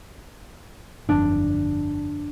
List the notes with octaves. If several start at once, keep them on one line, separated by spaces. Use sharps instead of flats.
G1 F2 D3 D4